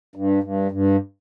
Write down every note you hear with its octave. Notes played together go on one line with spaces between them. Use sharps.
G2
G2
G2